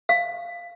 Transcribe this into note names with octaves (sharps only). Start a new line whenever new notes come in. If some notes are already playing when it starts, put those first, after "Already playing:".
F5